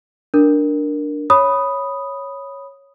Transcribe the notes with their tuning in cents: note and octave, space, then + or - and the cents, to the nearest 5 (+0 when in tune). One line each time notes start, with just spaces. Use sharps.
D4 +0 A#4 +0
C#5 +0 B5 +0 D#6 +0